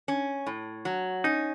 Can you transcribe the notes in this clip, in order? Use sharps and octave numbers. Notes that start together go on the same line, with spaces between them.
C#4
A2
F#3
C#4 D#4